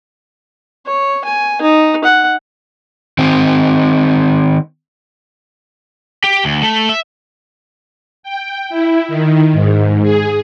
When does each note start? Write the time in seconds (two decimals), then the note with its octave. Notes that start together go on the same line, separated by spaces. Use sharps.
0.87 C#5
1.25 G#5
1.62 D#4
2.04 F#5
3.18 D#3 C4
6.24 G4
6.45 D2
6.63 A3
6.89 E5
8.23 G5
8.70 E4
9.08 D#3
9.53 G#2
10.03 G#4